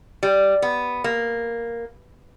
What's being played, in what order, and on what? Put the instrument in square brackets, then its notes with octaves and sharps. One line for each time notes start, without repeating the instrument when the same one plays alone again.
[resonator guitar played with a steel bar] G3
B3
A#3